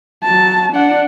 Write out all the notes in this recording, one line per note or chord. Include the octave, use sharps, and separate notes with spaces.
F#3 A5
D4 F#5